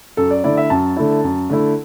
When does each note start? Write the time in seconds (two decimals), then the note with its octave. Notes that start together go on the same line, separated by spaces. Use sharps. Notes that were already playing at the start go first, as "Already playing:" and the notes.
0.17 F#2 A4
0.30 D5
0.44 D3 A3 E4 D5
0.57 E5
0.70 F#2 A5
0.96 D3 A3 E4
1.24 F#2
1.50 D3 A3 E4